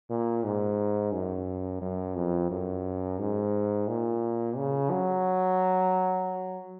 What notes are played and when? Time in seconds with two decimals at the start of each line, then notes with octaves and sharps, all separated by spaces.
0.10 A#2
0.44 G#2
1.13 F#2
1.82 F#2
2.16 F2
2.50 F#2
3.19 G#2
3.88 A#2
4.57 C#3
4.91 F#3